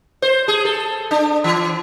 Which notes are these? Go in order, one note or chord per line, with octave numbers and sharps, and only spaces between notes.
C5
G#4
A4
D4
E3